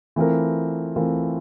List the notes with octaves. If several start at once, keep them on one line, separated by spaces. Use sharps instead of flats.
E3 A3 C4 F4 A#4
E3 A3 C4 F4 A#4